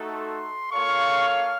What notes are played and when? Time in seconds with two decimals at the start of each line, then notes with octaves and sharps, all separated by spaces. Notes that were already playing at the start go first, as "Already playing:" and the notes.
Already playing: A3 D#4 F#4 A4
0.16 C6
0.71 A#3 F4 A4 C#5 F5 C#6
1.27 F6